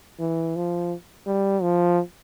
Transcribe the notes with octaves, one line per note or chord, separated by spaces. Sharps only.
E3
F3
G3
F3